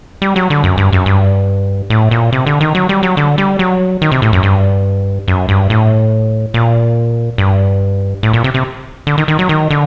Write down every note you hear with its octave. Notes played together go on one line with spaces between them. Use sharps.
G3
F#3
D3
F#2
G2
F#2
G2
A2
A#2
C3
D3
D#3
F#3
G3
F#3
D3
G3
F#3
D#3
C3
A2
F#2
G2
F#2
G2
A2
A#2
G2
A2
A#2
C3
C3
D3
D#3
D#3
F#3
D#3
D3